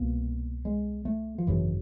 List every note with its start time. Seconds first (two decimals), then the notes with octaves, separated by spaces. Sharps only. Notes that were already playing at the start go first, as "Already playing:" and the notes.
Already playing: C2 B2 A#3
0.65 G#3
1.05 A3
1.38 F3
1.47 G#1 F#2 C#3 E3